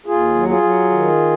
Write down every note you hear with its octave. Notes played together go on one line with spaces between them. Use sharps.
D#2 F4 G#4
F#3
F4 G#4
F#3
D#3